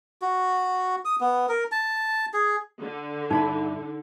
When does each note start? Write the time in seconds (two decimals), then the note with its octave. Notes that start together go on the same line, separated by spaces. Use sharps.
0.22 F#4
1.05 D#6
1.21 B3
1.49 A#4
1.72 A5
2.34 G#4
2.81 D3
3.31 G2 D#4 E4 B5